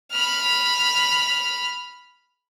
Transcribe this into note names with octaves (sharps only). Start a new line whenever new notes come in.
B5 F6